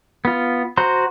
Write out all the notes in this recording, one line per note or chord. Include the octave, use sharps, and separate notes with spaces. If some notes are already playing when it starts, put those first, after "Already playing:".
B3 F4
F#4 C5 A#5 C6